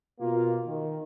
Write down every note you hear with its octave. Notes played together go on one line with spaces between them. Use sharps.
B2 A#3 F4
D#3